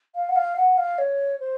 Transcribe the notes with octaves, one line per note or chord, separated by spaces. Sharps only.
F5
F#5
F5
F#5
F5
C#5
C5